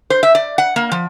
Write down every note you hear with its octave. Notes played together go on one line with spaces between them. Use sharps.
C5
E5
D5
F#5
A#3
F3